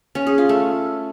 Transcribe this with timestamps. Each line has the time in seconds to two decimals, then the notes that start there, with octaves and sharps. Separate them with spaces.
0.15 C#4
0.27 G#4
0.38 F4
0.49 A3